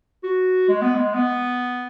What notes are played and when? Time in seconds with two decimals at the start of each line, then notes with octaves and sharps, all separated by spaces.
0.23 F#4
0.69 G#3
0.82 B3
0.95 G#3
1.14 B3